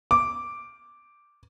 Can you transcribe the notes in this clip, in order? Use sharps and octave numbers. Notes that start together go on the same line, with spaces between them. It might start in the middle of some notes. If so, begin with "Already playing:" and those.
D6